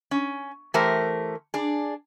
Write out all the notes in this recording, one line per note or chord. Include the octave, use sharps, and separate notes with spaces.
C#4
E3 A3 G4 A#4 C5
D4 G#4